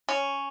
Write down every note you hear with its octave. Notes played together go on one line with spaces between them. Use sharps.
C#4